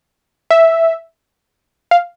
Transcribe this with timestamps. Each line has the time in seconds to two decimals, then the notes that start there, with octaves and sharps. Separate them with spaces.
0.50 E5
1.91 F5